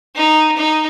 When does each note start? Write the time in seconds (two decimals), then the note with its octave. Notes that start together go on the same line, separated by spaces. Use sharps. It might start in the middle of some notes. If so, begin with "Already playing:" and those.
0.15 D#4
0.57 D#4